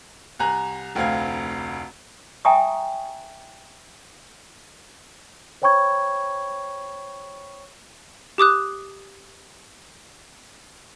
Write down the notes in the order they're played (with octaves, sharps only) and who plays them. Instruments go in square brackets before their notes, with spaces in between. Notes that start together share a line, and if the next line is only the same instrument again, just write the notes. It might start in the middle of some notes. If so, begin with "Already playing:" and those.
[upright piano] C2 G#5 A#5 F#6
F1 D2 C4 F5 G#6
[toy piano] E5 G5 G#5 A#5 C#6 D#6
[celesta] C5 C#5 G5 B5 C#6 G#6
[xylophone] G4 D6 D#6 F#6